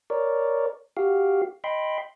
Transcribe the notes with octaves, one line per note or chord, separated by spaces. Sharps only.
A#4 C#5 D5
F#4 G4 F5
D#5 G5 B5 C6